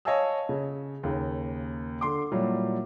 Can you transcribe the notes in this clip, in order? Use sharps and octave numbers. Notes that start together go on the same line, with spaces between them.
C#5 D#5 F5 G#5 A5 E6
C#3
D#2 C#3 A#3
D3 C6 D6
A#2 F#3 G3 E4